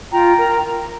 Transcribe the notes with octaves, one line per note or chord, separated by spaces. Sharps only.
F4 G5 A#5
A#4